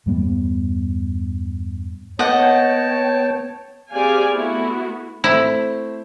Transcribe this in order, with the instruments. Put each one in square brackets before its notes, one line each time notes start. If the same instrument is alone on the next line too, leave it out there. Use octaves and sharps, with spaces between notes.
[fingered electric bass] E2 G2 G3 B3
[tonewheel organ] B3 G5 [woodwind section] C#5 [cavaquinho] D#5 F#5 [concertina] A5
[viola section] C4 G4 G#4 D5 F5 G#5
A3 B3 E4 F#4
[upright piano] A3 C4 [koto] E4